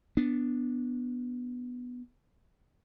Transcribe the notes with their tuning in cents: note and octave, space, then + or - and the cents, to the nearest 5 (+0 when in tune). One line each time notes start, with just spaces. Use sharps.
B3 +0 D4 +0